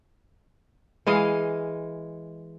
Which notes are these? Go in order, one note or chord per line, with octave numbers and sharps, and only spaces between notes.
E3 G#3 D#5 F5